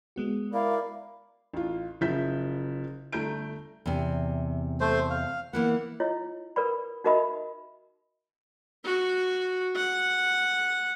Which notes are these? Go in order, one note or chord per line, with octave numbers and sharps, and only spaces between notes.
G#3 B3 F#4
E4 A#4 D5 F5
A1 F4
F#1 C#3 F3 E5 G6 B6
G1 A3 A#5 G6 D7
E2 C3
A3 C5
F5
E3 A#3 B3 F#5
E4 F4 C#5 D#5
A#4 B4 D5 B5
D#4 F#4 A#4 D#5 E5 B5
F#4
F#5